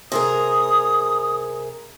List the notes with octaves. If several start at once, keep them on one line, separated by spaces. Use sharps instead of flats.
C3 G#4 A#4 D#6